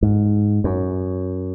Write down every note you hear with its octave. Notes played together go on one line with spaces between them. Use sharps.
G#2
F#2